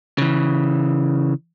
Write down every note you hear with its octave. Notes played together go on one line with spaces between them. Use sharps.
C#3 E3